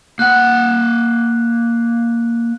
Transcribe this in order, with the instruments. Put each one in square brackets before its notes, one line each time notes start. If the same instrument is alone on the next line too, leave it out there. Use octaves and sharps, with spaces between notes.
[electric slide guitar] A#3 F#5 [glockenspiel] F#6